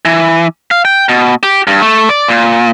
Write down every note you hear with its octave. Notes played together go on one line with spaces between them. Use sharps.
E3
F5
G5
B2
G4
G2
A3
D5
A#2